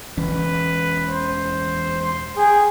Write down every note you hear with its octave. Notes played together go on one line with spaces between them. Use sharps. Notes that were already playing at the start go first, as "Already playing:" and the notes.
E1 E3 C#4 B4
C5
C6
G#4 G5